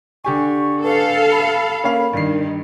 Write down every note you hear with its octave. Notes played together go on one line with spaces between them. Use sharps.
D3 G4 G#5 C#6
A4 B4 F5
B5
A#3 C#4 F5
G2 D#3 C7